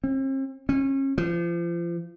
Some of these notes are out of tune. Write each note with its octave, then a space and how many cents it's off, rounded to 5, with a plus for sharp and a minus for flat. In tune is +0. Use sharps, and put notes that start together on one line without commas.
C4 +45
C#4 -35
F3 -35